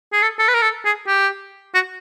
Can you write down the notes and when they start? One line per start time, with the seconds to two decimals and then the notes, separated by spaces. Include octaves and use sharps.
0.13 G#4
0.22 A4
0.39 A4
0.48 B4
0.54 A#4
0.62 A4
0.85 G#4
1.07 G4
1.74 F#4